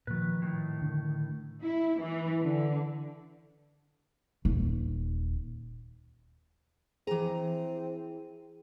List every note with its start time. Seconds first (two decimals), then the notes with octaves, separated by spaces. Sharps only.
0.07 A#2 D#3 F3 B4
0.42 A2 D#3
0.82 D3
1.63 E4
2.00 E3
2.42 D3
4.45 D#1
7.07 E3 C4 G#4 A#5